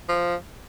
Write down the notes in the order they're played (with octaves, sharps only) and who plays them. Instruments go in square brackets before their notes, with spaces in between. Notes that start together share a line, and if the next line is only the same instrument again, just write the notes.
[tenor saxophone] F3